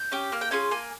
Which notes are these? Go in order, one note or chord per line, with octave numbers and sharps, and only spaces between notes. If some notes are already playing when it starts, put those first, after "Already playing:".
Already playing: G6
C#4 G4
A#3 F6
G5
C#4 F4 G#4 G#5
A#3 G#5